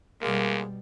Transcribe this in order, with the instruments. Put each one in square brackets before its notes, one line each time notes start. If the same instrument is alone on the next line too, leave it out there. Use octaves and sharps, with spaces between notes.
[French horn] D2 [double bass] B2 G3 [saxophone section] G#3 A#3